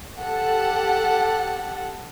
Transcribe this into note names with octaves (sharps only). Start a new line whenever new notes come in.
G4 A4 F#5